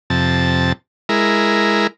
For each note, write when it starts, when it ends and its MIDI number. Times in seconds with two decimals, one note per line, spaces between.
0.10 0.72 41
0.10 0.72 48
0.10 0.72 81
1.09 1.87 56
1.09 1.87 64
1.09 1.87 70